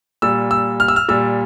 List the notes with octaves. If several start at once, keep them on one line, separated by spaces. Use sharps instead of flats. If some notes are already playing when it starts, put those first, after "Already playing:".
A#2 G3 E6
E6
F6
E6
F6
A#2 G3 E6